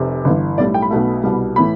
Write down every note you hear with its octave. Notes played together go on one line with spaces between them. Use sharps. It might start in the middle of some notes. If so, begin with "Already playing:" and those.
Already playing: F1 C3
G1 G2 E3
B1 A2 G3 D5
G5
B5
B1 B2 A3
C2 B2 G3
A2 E3 B5